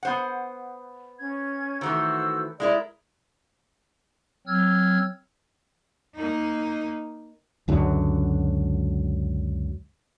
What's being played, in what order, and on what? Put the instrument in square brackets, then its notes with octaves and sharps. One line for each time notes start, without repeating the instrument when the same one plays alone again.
[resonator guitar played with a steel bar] B3 C5 F#5
[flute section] C#4 G#6
[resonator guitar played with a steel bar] D#3 E3 A3 [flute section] F#4 C5 E6
[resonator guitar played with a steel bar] G#3 E4 A#4 [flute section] D5
[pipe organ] F#3 C4 E6 F6 G#6
[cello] A#3 D#4
[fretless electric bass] C#2 F#2 D3 F#3